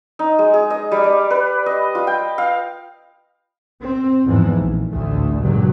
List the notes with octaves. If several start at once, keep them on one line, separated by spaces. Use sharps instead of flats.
D#4
G#3
G#4
D#5
G3
D5
B4
D#5
F4
G5
F5
C4
E2 G#2 E3 F3
A#1
A1 D2 A3
C#2 G2 A#2 F#3